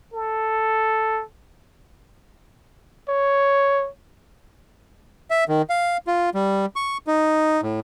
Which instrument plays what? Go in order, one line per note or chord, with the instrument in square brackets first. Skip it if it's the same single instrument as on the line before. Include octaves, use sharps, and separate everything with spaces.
[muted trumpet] A4
[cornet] C#5
[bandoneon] E5
D#3
F5
F4
G3
C#6
D#4
A2